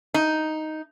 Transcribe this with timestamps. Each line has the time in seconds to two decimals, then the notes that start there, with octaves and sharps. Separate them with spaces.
0.14 D#4